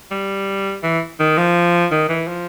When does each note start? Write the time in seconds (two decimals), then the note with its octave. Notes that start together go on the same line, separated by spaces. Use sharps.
0.11 G3
0.83 E3
1.19 D#3
1.37 F3
1.91 D#3
2.09 E3
2.28 F3